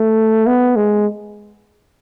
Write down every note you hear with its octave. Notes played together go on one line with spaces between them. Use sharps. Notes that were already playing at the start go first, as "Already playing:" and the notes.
Already playing: A3
B3
G#3